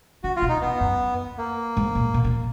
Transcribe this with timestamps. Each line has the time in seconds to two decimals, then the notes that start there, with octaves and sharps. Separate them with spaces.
0.24 D3 F#4
0.36 F4
0.42 B2
0.49 D#4
0.61 B3
0.80 F#2
1.38 A#3
1.77 G#2
1.95 A#2
2.14 B2
2.24 A#2